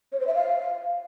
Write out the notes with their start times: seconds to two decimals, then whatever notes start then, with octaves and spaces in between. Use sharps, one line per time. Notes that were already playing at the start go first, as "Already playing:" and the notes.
0.12 C#5
0.20 C5
0.27 E5
0.34 F5